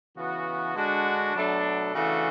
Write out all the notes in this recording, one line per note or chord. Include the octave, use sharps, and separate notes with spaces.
C#3 E3 B3 F#4
D3 G#3 D4 F#4
B2 F#3 A3 D4
C#3 E3 A3 D4 F#4